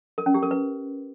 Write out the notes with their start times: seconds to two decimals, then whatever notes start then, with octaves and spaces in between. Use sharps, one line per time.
0.18 A#4
0.26 C#4
0.34 G4
0.43 A#4
0.51 B4